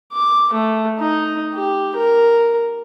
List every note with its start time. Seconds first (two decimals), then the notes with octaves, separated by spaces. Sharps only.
0.13 D6
0.53 A3
0.98 D#4
1.53 G4
1.96 A#4